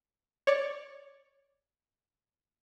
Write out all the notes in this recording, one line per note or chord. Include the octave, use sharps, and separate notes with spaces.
C#5 D5